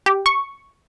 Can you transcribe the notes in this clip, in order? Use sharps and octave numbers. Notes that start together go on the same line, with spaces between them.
G4
C#6